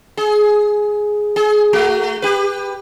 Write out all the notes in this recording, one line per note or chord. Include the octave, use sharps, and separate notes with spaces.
G#4
G#4
A3 F#4
G4 B4